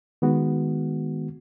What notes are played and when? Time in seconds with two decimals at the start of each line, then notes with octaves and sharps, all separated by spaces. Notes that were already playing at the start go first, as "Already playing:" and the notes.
0.22 D#3 G#3 B3 F#4